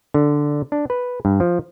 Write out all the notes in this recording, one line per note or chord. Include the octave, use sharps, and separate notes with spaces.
D3
D4
B4
G2
F3